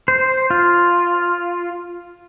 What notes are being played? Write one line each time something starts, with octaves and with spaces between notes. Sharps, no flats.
C5
F4